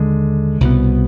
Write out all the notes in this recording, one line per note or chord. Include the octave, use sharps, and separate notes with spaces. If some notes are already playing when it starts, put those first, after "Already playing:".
Already playing: D#2 D3 G#3
C2 B2 B3